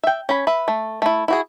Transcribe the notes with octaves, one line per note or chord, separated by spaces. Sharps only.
E5 G5
C#4 G#5 B5
B4 E5
A3
A3 E4
E4 F#4 G#4